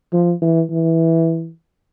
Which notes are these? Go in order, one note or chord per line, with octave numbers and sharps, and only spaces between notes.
F3
E3
E3